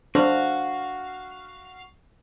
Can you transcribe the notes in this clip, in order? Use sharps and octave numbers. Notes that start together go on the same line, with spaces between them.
D4 F#4 A4 C5 F5